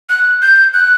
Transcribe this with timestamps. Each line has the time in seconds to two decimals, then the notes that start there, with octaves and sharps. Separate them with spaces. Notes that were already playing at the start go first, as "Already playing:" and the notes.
0.09 F#6
0.42 G6
0.74 F#6